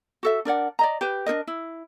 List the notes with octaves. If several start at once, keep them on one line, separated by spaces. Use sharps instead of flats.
F#4 A4 E5
D4 A#4 D5 F#5
D5 D#5 A#5
G4 B4
D4 D#4 A#4 D#5
E4